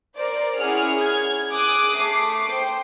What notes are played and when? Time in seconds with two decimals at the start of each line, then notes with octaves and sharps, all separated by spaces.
0.17 A#4 C5 D5
0.56 C#4 E4 G#4 F#5 F6
1.03 G#6
1.52 G#4 D6 D#6 F#6
1.96 A3 D6 C7
2.51 C5 G5